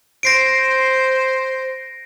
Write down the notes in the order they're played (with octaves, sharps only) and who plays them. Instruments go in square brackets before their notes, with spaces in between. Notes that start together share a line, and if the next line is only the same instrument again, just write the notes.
[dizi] C5 [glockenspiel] A#6 C7 D7